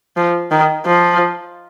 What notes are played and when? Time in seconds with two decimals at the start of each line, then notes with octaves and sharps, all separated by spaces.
0.17 F3
0.51 D#3
0.86 F3